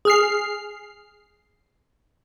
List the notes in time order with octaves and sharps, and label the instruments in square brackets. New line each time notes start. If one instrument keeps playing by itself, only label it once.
[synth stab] G#4 F6 C7